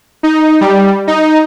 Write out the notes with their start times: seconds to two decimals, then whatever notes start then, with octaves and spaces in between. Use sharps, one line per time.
0.23 D#4
0.61 G3
1.07 D#4